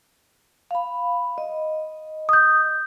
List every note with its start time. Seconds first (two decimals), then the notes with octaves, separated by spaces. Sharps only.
0.71 F5 B5
1.38 D#5
2.29 D#6 G6